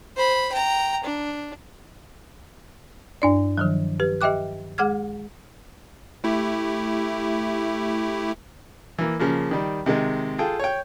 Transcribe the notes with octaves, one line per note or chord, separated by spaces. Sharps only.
C5 B5
G5 A#5
D4
G2 D4 D5
D#3 F3 F#3
G4 B4
G4 D#5 E5 G5 D6 F#6
G#3 G#4 F#5 D6 F6 G#6
A3 E4 G4
E3 A#3
C#3 F3 A#3
D#3 G3
C3 D#3 G#3
F4 G#4 A4 G5
C#5 G5